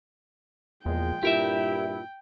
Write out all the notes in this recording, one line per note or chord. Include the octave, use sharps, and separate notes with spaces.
E2 A#2 F3 G#3 G5
G2 A#2 E4 F4 G4 A#4 E5